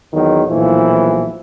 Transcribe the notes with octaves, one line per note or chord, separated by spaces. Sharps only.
E2 D#3 F#3 A#3
B1 A#2 E3 F3 E4